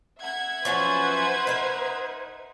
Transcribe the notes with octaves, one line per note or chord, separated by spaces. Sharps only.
E5 F#5 G#6
F3 F#3 C#4 B4 C5
D#4 A#4